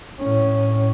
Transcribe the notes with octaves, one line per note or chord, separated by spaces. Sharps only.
A2 C#4